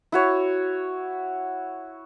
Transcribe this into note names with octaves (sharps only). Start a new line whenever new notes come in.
E4 F#4 C#5